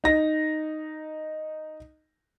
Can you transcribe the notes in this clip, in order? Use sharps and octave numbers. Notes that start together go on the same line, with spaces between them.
D#4 A#6